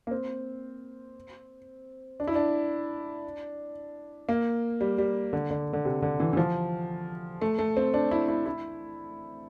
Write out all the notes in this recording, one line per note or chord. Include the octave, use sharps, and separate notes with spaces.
A#3
C4
D4
E4
D4
A#3
G3
G3
D3
D3
D3
C3
D3
E3
E3
F3
A3
A3
C4
D4
E4
E4
E4